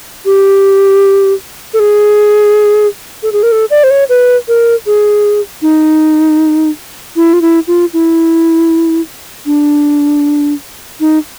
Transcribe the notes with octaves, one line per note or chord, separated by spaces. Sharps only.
G4
A4
G#4
A4
G#4
A#4
A4
D5
C5
C#5
B4
A#4
G#4
D#4
E4
F4
E4
F4
E4
D4
D#4